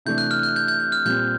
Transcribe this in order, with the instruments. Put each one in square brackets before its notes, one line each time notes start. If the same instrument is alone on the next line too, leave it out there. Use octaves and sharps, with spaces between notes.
[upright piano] C3 E3 A3 D4 [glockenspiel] G6
[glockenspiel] F#6
F6
F#6
G6
G6
F#6
F6
[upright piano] A#2 G3 C4 [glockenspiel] G6